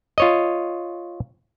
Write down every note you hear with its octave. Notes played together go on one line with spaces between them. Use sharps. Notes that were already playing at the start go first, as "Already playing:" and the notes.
F4 C#5 D#5